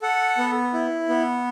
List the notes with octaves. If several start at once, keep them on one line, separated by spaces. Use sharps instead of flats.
A4 F#5
B3
E4
B3